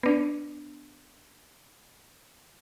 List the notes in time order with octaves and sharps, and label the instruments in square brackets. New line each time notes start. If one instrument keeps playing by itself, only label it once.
[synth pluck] B3 D4